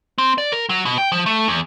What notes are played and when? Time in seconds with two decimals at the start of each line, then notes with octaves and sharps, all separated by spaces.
0.18 C4
0.38 D5
0.52 A#4
0.69 F#3
0.85 B2
0.98 G5
1.12 F3
1.26 A3
1.48 E2